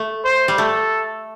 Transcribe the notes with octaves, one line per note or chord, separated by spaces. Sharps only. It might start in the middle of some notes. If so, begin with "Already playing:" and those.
Already playing: A3
C5
G3
A3 A4